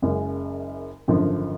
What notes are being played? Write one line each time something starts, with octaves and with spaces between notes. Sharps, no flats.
F#1 F#2 C#3 G#3
G#1 F#2 D3 F3